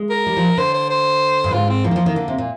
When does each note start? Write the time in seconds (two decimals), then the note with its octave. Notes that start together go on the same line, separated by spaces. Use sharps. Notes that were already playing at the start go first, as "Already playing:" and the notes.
Already playing: G#3
0.10 A#4
0.27 G3
0.37 F3
0.57 D3 C5
0.74 C5
0.90 C5
1.44 G2
1.53 G#2 F4
1.69 C4
1.84 F3 A#3
1.91 D#3
1.96 F3
2.06 D#3
2.16 D3
2.28 C3
2.38 A#2